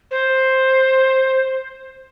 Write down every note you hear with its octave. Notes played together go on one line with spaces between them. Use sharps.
C5